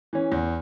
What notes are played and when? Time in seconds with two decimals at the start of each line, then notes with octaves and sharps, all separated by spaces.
0.13 E3 C#4
0.32 E2